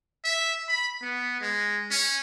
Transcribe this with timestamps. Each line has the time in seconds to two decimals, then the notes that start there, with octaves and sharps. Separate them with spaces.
0.25 E5
0.68 B5
1.02 B3
1.41 G#3
1.91 C#4